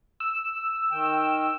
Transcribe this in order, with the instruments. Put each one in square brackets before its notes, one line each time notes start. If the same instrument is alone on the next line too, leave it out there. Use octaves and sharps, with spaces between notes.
[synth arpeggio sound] E6
[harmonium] D#3 G5